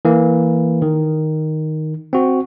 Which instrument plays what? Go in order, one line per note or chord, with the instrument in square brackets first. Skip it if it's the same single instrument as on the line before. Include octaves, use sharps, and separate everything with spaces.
[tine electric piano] E3 A#3
D#3
C4 F#4